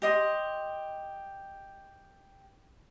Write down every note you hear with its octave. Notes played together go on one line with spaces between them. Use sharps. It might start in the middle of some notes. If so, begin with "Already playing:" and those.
G4 D#5 C6